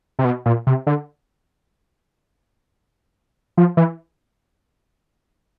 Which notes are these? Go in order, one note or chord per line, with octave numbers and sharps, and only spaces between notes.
C3
B2
A#2
C3
D3
F3
E3